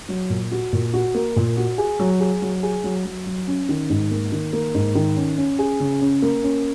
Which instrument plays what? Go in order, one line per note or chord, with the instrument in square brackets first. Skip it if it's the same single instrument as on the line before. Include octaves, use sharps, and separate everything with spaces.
[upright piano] F#3
A#2
F#4
A#2
F#4
A#3
A#2
F#4
G#4
F#3
G#4
F#3
G#4
F#3
F#3
F#3
C#4
D#3
G#2
A#3
D#3
A#3
G#2
D#3
C#4
C#4
G#4
C#3
C#4
A#3
C#4